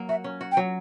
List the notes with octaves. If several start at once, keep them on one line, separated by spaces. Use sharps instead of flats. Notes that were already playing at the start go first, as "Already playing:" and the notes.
Already playing: F#3 A#3
F#4 E5
C#4
F#4
G5
F#3